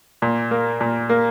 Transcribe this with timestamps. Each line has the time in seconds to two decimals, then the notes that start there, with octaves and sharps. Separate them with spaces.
0.22 A#2
0.51 A#3
0.81 A#2
1.09 A#3